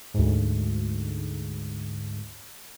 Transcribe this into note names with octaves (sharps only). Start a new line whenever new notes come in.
D2 G#2